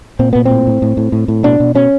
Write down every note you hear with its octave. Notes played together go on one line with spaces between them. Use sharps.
A#2 C4
A#2 B3
C4
A2
A2
A2
A2
A2
A2
B2 D4
B2
B2 C#4